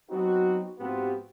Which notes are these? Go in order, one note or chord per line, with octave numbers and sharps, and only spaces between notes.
F#3 B3 C4 D#4 F#4
G#2 F3 B3 C4 F#4 G4